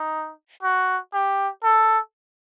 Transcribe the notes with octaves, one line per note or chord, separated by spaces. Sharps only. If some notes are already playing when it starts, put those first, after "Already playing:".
Already playing: D#4
F#4
G4
A4